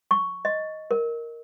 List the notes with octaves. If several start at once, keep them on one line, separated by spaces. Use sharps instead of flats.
C#6
D#5
A#4